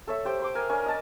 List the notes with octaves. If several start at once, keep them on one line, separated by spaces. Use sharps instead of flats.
A4 C#5 E5
G4 C5 G5
C5 C6 D6
A#4 G#5
C#4 D4 A#4 G#5
D#5 A5